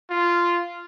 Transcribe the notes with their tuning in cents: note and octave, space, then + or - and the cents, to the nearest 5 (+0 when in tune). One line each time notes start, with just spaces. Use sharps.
F4 -10